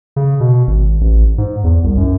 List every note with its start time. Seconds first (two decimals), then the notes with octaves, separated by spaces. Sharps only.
0.16 C#3
0.40 B2
0.67 G#1
1.01 A1
1.38 G#2
1.64 E2
1.84 C2
1.97 F#2